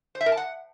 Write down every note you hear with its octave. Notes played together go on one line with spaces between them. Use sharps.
C5
E5
A#4
A5
F#5